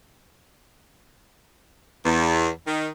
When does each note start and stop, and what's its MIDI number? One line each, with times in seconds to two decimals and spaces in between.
2.05 2.49 40
2.67 2.88 51